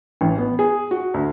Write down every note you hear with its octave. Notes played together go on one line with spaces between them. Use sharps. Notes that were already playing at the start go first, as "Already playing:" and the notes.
A1
B3
G#4
F#4
D2